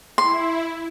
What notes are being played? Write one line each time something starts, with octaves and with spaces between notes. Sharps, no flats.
E4 C6